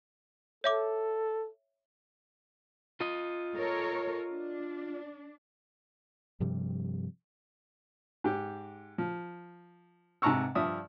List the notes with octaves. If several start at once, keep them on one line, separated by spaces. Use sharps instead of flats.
A4 C#5 E5 D6
F4 D#5
A4 A#4 C#5
D4
G2 C3 F3 G3
G#2 G4
F3
G#2 C3 A5 A#5 C#6 E6
G2 F3 D5 E5 D#6 E6